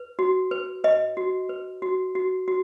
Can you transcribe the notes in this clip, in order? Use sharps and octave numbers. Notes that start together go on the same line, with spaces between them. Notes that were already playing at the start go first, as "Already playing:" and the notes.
Already playing: B4
F#4
B4
B4 D#5
F#4
B4
F#4
F#4
F#4